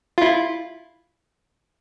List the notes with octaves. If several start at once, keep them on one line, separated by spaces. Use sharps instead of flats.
E4 F4